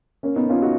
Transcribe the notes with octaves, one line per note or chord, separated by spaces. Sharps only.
A#3 C#4
B3 D#4
C#4 F4
D#4 F#4